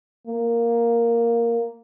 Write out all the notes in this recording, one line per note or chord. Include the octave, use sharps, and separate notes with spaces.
A#3